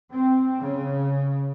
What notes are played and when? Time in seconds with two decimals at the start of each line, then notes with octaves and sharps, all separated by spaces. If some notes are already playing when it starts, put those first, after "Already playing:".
0.12 C4
0.62 C#3